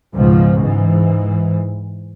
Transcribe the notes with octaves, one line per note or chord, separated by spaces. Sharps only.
C#2 G#2 B2 F3
G#2 E3